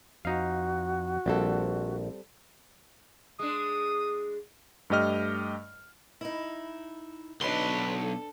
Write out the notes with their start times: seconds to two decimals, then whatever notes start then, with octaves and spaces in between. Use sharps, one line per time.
0.25 F2 D#4 F#4 F5
1.26 A#1 G3 C4 A4
3.39 G#3 D4 D#6
4.90 G2 A3 G4 D#5 F6
6.21 D#4 E4
7.41 B1 D3 F#3 D4 D#4 B4 C6
7.97 A4